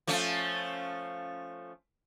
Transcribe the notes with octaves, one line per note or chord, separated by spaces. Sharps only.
F3 A3 C#4